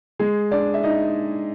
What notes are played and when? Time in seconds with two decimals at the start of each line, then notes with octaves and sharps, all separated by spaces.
0.19 G#3 G#4
0.51 D4 D5
0.74 E5
0.83 D#4 D#5